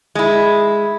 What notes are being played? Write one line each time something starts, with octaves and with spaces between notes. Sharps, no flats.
G#3 E4